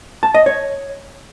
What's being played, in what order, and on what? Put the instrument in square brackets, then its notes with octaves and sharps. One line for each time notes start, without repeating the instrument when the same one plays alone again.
[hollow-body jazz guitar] A5
D#5
C#5